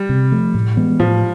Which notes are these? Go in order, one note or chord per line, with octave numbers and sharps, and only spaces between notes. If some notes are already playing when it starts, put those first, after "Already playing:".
Already playing: G3
C3
F3 A3
A2
E3 G#3 B3
A2 F3